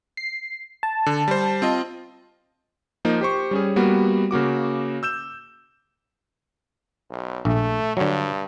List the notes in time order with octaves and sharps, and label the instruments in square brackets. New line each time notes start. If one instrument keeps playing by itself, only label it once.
[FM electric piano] C7
A5
[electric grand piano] D3
G3 C5
C4 F4 D#5
F3 A#3 D#4
G4 C5 C#6
G3 C#4 G#4
G3 A#3 B3 F#4
C#3 A#3 F#4 D6
E6 G6 E7
[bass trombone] B1
[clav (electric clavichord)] A#1 [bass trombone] A3
[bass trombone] G2 [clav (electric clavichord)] D3 F#3